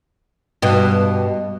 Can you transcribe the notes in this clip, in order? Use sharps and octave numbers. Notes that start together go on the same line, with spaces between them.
G2 B2